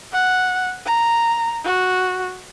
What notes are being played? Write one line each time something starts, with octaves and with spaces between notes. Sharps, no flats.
F#5
A#5
F#4